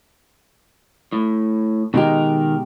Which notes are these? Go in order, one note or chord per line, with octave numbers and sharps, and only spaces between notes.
A2
B2 D#3 G#3 G4 A#4